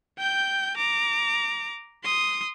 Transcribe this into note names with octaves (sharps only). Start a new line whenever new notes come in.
G5 G6
A#5 D6
C6 D#6